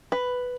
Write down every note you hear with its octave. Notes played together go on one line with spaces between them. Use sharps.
B4